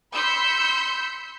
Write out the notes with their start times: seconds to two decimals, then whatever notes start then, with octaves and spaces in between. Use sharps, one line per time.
0.13 B5 C6 E6 G6 B6 C#7